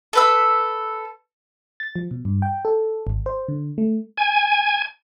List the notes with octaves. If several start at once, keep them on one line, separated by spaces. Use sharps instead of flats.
A4 B4 E6
A6
F3
B2
G2
G5
A4
G#1
C5
D3
A3
G#5